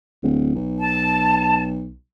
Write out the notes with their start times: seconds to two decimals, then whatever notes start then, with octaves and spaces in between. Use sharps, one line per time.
0.23 D1
0.55 B1
0.79 A5